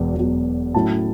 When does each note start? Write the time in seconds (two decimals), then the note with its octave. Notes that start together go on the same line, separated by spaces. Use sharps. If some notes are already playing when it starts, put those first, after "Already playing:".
Already playing: E1 E2 B2 F#3
0.15 E1 E2 B2 F#3
0.75 A2 F#3 C#4 E4 A5